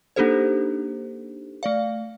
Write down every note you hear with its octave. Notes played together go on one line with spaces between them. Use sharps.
A#3 D4 D#4 G4 A4 C5
A3 D5 F5